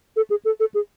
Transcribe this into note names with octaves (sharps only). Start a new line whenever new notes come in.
A4
G#4
A4
A4
G#4